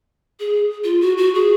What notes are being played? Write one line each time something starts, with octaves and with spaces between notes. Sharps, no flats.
G#4
F4
F#4
F#4
G#4